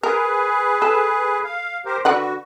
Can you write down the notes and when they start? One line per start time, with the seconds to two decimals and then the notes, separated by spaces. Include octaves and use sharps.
0.03 G#4 A#4 B4
0.82 A4
1.44 F5
1.86 G4 A#4 C5
2.05 D3 F#4 B4 F#5